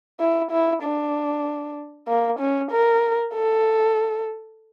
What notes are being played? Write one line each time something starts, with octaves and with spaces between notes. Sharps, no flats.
E4
E4
D4
A#3
C#4
A#4
A4